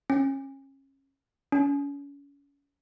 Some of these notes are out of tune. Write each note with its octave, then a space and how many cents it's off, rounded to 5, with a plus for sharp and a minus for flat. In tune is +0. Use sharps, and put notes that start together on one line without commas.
C#4 -30
C#4 +35